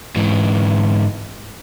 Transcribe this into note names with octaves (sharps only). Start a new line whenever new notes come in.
G#2 E3